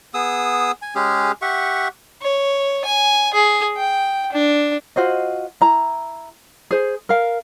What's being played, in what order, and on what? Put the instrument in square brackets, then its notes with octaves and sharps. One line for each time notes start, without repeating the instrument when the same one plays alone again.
[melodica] B3 G#4 D#6 E6
G#5
G#3 C#4 G4 G#4
G4 E5 F#5 C#6
[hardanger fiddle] C#5
G#5
G#4
G5
D4
[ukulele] F4 F#4 C5 D#5
E4 A#5
G#4 C5
A#4 F5